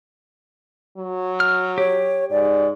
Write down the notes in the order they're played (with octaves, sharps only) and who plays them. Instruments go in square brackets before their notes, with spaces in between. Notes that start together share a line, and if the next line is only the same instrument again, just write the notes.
[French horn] F#3
[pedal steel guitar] F6
[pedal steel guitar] G4 [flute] C#5
[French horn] G#2 [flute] D5